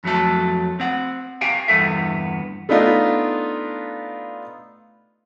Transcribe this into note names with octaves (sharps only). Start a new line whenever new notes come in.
F2 F#3 A3 A4
C4 F#5
G4 F5 G5 G#5
E2 G2 A3 B3 A4 E5
A3 B3 D4 D#4 F4